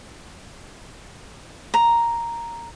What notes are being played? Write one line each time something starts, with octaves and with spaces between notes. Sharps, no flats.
A#5